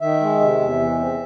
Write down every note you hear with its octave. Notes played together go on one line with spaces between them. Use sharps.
D#3 E5
G#3
C3
E2
E3
C4